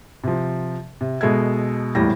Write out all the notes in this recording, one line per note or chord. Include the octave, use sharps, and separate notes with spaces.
C3 F3
C3
B2 G#3 A4 E5 G#6
D#1 E2 A2 G3 A#6